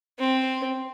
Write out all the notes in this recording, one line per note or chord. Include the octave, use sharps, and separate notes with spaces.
C4